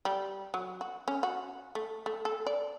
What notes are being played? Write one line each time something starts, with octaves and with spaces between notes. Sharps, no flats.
G3
F#3
F#4
C#4
F#4
A3
A3
A4
D5